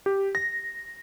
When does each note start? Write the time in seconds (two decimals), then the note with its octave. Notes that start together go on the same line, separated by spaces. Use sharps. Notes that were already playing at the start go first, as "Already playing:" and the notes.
0.06 G4
0.35 A#6